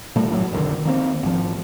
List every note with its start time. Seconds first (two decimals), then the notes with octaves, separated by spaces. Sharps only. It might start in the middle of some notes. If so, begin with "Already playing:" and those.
0.16 A#2 G3 A3
0.29 G1 A2 C3 F#3
0.52 F1 B1 D3 D#3
0.85 D#3 A#3 C4
1.23 G#1 F3